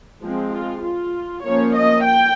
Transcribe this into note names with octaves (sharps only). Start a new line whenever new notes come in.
F3 G#3 C4
F4
F4
F3 A#3 C#4 C#5
D#5
G5